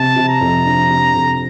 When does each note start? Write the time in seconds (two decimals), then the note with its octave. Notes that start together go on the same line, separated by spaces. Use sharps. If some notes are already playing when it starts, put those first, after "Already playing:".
Already playing: C3 A5
0.16 C3
0.29 A#5
0.41 F2
0.65 D4
0.90 C3
1.15 F2